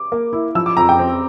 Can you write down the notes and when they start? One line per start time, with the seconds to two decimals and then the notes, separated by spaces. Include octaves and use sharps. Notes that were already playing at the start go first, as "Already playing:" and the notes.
Already playing: D6
0.12 A#3
0.33 E4
0.55 F3 E6
0.66 D6
0.77 F2 A#5
0.89 G5
0.99 C4